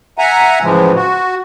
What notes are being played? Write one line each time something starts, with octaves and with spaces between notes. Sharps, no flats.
E5 F#5 G#5 A#5
A2 C#3 E3 F3 G#3
F#4